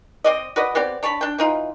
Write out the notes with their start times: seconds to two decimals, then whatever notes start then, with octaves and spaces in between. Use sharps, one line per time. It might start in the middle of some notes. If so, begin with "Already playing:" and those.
0.24 C4 D5 D#5
0.56 F#4 B4 D5 D#5
0.75 B3 C4 G4 D5
1.03 D4 C#5 A5 B5
1.21 D4 G5
1.38 E3 D#4 F4